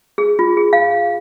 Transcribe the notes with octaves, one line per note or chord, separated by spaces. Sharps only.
G#4
F4
G#4
F5